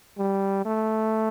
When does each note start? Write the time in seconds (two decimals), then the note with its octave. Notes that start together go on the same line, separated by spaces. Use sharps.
0.18 G3
0.66 A3